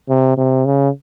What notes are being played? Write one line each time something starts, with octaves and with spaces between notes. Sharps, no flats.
C3
C3
C#3